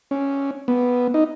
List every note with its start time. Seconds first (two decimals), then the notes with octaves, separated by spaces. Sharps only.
0.11 C#4
0.68 B3
1.14 D#4